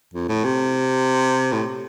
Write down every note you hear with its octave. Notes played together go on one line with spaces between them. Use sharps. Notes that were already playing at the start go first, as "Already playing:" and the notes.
F2
A2
C3
A2